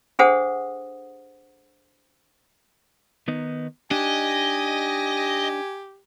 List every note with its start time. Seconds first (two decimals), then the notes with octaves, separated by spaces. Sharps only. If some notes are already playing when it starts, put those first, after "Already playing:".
0.19 D4 G#4 A4 C5 F#5 D#6
3.28 D#3 B3 D#4
3.91 D4 D#4 G4 D#5 G#5